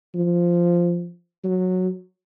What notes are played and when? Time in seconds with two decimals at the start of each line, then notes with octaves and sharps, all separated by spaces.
0.15 F3
1.44 F#3